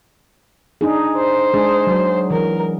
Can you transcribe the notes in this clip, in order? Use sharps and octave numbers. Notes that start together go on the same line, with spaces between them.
D4 D#4 G#4
C5
G#3 D4 G#4
F#3
E3 A#4